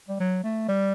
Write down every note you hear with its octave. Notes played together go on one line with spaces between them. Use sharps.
G3
F#3
A3
G3